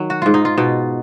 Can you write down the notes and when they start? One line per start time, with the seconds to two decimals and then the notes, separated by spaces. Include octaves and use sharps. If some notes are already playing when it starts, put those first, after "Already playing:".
Already playing: D#3 F#3
0.10 F#4
0.22 G#2 F4
0.34 D#4
0.45 F4
0.58 B2 D#4